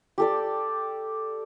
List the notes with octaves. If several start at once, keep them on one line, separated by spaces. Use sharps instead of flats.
G4 A4 D5